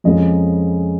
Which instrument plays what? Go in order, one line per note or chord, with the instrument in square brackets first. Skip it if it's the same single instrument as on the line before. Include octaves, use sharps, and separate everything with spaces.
[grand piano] F2 C#3 F3 G#3 D#5